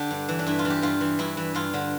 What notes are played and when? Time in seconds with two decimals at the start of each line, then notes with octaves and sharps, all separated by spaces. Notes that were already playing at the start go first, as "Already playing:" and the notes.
Already playing: D3 G4 A4
0.11 G2
0.29 E3
0.39 D4
0.47 G2 E4
0.59 F4
0.65 E3
0.70 G4
0.82 G2 F4
1.01 E3
1.19 G2 E4
1.37 E3
1.55 G2 F4
1.74 D3